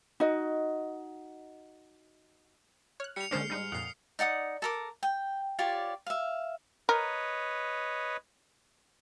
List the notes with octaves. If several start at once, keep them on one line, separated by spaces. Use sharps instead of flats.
D#4 F#4 D#5
C#5 F6 F#6
G3 C#7 F7
D3 G#3 A#3 C#4 D4 C5 F6 C7
G#2 G3 D#4
F2 A#2 F#5 D#6 C7
D#4 D5 F#5 D#6
A4 A#4 D6
G5
F4 G4 C#5 D5
E5 F5
A#4 B4 C#5 D#5